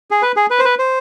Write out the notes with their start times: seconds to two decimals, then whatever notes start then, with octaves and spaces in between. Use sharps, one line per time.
0.11 G#4
0.22 B4
0.36 G#4
0.50 B4
0.59 C5
0.65 B4
0.79 C5